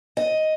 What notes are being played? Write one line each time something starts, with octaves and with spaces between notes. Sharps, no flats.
D#5